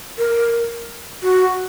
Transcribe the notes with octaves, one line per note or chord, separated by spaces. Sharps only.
A#4
F#4